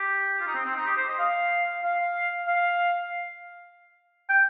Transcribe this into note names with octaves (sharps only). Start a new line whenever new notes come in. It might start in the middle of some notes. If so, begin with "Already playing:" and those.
Already playing: G4
F4
D#4
C4
C4
D#4
G4
C5
D#5
F5
F5
F5
G5